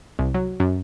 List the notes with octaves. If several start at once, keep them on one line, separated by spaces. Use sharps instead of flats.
C2
F#3
F#2